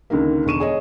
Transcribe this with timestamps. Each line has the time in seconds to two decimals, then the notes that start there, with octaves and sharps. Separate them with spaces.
0.10 C#2 D3 D#3 A#3
0.46 E1 D3 C#6 D#7 E7
0.60 G#4 C#5 D#5